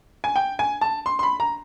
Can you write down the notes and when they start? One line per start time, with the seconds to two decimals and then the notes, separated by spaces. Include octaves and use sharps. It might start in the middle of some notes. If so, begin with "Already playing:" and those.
0.24 G#5
0.36 G5
0.59 G#5
0.81 A5
1.06 C6
1.19 C6
1.23 B5
1.40 A#5